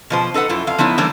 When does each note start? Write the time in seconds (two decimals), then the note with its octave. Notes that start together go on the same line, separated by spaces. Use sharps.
0.10 B2 F3 C5
0.34 D#4 A4 B4 F#5
0.49 F#2 E4 F4
0.67 F2 F5
0.78 F3 B3 D#4 E4 C#5
0.98 E3 G3 A3 A#3 D4 C5